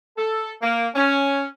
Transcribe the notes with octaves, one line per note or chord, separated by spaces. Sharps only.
A4
A#3
C#4